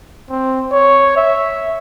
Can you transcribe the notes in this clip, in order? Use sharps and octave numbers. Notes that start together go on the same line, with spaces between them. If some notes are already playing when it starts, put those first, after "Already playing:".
C4
C#5
E5